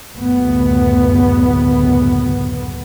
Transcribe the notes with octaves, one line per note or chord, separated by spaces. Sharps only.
F#1 D2 A2 B3